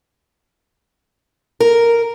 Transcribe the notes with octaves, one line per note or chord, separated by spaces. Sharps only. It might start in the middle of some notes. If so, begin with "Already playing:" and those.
A#4